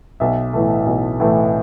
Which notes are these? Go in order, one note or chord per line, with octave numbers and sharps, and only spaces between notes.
B1 E5
A2 E3 A3
B1
A2 E3 A3